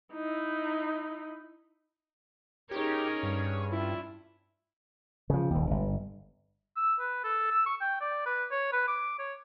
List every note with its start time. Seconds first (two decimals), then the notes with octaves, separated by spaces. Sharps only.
0.14 D#4 E4
2.71 C#4 D#4 G4 G#4 A#4 C#5
3.23 G2
3.72 C#4 D4 E4 F4
5.30 C#3 F3
5.50 D#1 D#2
5.71 G1
6.77 E6
7.00 B4
7.24 A4
7.51 E6
7.66 C#6
7.81 G5
8.01 D5
8.26 B4
8.52 C#5
8.73 B4
8.88 D6
9.19 C#5